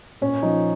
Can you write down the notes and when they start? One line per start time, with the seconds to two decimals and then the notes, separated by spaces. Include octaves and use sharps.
0.21 A#2 C#4
0.42 F3 D#4